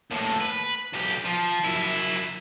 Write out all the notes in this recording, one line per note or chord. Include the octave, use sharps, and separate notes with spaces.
D#2 A2
B4
B1 G4
F3
F#2 E4